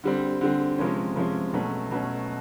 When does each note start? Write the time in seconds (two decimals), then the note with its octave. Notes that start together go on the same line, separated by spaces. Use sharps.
0.04 D3 G3 C4
0.41 D3 G3 C4
0.78 C3 F3 G#3 C#4
1.16 C3 F3 G#3 C#4
1.53 B2 F#3 A3 C#4
1.91 B2 F#3 A3 C#4